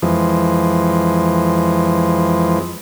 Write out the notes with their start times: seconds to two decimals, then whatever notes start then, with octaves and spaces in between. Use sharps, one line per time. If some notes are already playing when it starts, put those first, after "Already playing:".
0.02 F2 E3 F3 G#3